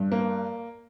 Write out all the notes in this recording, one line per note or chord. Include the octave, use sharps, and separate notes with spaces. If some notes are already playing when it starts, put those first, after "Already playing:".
Already playing: G2
A#3